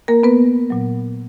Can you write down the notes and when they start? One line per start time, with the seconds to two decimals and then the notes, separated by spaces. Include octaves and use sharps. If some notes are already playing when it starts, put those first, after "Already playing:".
0.08 A#3 A#4
0.23 B3 B4
0.70 A#2 F#3